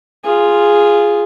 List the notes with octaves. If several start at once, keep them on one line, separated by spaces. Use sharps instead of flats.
F4 G#4